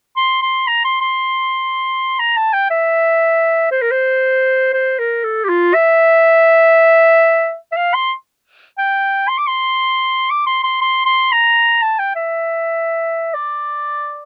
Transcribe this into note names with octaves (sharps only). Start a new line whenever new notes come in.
C6
C6
A#5
C6
C6
A#5
A5
G5
E5
C5
A#4
C5
C5
A#4
A4
G4
F4
E5
E5
F5
C6
G5
C6
D6
C6
D6
C6
C6
C6
C6
A#5
A5
G5
E5
D5